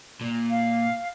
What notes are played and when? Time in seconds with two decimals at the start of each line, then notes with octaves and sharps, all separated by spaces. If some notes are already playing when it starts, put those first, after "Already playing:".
0.21 A#2
0.50 F5